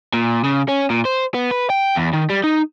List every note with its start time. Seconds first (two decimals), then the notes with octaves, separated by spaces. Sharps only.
0.14 A#2
0.44 C#3
0.68 C#4
0.90 A#2
1.05 C5
1.34 B3
1.51 B4
1.70 G5
1.96 E2
2.13 D#3
2.30 G3
2.44 D#4